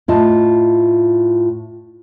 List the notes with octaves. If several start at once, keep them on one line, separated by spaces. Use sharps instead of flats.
A2 F4 D#5 A5